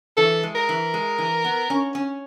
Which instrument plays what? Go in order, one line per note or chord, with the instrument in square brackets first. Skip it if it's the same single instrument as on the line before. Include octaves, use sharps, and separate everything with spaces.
[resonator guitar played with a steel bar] E3 [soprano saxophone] A4
[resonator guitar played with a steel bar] G#3
[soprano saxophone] A#4
[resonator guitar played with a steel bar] E3
G#3
E3
B3
C#4
C#4